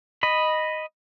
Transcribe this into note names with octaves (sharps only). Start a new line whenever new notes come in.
D#5 B5